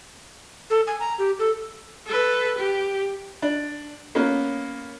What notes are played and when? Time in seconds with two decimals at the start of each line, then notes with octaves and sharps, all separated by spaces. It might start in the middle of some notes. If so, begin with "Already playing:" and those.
0.70 A4
0.87 G#5
1.00 A#5
1.18 G4
1.39 A4
2.07 A4 B4
2.58 G4
3.42 D4
4.15 A#3 B3 C#4